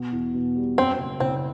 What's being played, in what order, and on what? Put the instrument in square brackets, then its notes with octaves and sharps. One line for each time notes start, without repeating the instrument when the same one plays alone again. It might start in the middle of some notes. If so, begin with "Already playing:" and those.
Already playing: [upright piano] B2
E2
B2
G3
[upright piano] F#2 [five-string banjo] C4
[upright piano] F#1
[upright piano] F#1 [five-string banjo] C4